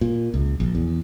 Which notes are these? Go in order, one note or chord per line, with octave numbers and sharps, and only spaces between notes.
A#2
C#2
A#1
E2